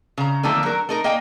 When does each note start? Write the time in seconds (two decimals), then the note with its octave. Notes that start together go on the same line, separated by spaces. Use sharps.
0.18 C#3 A#5
0.43 D3 D#3 F3 A3 A#3 C4
0.63 F#3 A#4
0.89 A3 D#4 A#4
1.04 A#3 D#5 G5 G#5